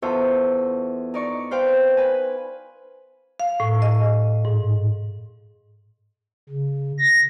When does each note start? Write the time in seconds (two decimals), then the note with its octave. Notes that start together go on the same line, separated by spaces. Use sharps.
0.02 E2 F4 A4 C5 E5 C#6
1.14 D#4 D5 C#6
1.51 B4 C5 F5 G5
1.97 B4 G#5
3.40 F5
3.60 A2
3.82 D#5
4.45 G#2
6.49 C#3
6.99 A#6